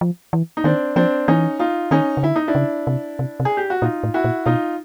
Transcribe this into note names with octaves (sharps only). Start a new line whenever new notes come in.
F3
E3
D#4
D#3 C4 D4
F3 C4 D4
E3 C#4 D#4
D#4 F4
D#3 C#4 D#4
C#3
D3 E4
D#4
D4 E4
C#3
C3
C3
C3
G#4
G4
F#4
A#2 D#4 F4
A2
E4 F#4
A#2
B2 D#4 F4